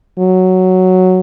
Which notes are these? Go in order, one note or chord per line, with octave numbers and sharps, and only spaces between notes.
F#3